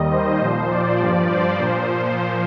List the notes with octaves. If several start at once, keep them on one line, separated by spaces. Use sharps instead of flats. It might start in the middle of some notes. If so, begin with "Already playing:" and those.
Already playing: D#2 D#3 G3 D#5
C5
A#2 F3 C5
D5
G2 F3
C5
A#2 F3